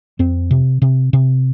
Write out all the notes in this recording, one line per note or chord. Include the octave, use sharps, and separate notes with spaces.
F2 C4
C3
C3
C3